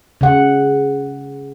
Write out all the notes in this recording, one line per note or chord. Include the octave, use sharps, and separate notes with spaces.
C#3 F#5